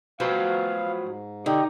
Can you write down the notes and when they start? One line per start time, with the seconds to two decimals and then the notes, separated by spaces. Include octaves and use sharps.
0.20 F3 F#3 B3 F#4 C5 F5 G5
1.03 G#2
1.46 D3 D#4 G4 D#5